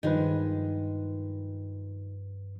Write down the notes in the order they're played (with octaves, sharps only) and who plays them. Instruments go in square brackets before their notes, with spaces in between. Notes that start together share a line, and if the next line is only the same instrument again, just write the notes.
[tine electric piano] G2 F3 B4 [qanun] D#3 G#3